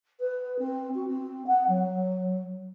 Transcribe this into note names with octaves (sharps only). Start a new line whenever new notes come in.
B4
C4
F#4
C4
F#5
F#3